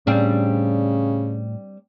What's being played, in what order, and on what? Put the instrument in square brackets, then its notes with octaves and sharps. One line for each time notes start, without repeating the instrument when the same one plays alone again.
[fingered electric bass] A2 [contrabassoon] C#3 [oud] G3 C4 D4